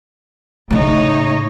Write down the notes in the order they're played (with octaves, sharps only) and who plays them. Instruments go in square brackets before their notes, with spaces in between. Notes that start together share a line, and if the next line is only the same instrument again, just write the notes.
[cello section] A2 D#4 C#5 [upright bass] C#3 A3